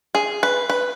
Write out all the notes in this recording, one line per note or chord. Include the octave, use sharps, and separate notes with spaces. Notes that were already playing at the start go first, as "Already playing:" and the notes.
G#4
B4
B4